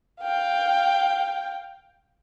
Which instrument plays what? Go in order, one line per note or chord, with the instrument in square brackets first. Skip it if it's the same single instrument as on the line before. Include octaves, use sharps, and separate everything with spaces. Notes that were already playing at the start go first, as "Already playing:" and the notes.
[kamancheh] F5 G5